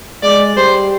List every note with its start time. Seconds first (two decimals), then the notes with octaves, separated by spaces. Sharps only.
0.23 G#3 D5
0.57 G3 C5